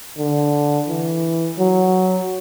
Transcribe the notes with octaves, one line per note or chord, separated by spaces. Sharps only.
D3
E3
F#3